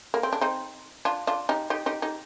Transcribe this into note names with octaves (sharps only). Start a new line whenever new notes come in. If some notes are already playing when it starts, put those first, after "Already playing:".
A#3
C4
D4
C4 D#4
D4 F4
D4 F4
D#4 G4
D#4 G4
D#4 G4
D#4 G4